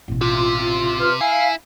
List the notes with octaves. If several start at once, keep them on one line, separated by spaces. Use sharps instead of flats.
A1 B2
C3 F4
B4 C6 F6
E4 F5 G#5